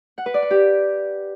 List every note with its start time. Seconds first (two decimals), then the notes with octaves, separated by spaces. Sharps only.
0.18 F#5
0.26 B4
0.34 D5
0.42 F#5
0.50 G4